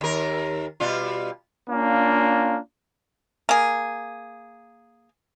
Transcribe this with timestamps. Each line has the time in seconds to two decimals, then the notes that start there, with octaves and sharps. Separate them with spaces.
0.01 D#2 A#4
0.80 B2 G3 F4
1.69 A#3 C#4 D4 F4
3.49 A#3 G#4